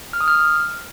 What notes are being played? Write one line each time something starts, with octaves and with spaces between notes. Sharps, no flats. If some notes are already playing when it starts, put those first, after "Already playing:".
F6
D#6
F6